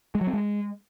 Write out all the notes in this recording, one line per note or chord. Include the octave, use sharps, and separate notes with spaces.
G#3
F#3
C4
G#3